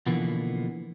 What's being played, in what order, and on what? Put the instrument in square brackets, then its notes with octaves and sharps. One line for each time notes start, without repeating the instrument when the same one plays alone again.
[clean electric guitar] B2 D3 E3 F3 A#3 B3